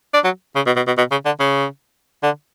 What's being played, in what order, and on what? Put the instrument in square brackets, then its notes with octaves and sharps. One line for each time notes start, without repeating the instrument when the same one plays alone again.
[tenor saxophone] D4
F#3
C#3
B2
B2
B2
B2
C#3
D3
C#3
D3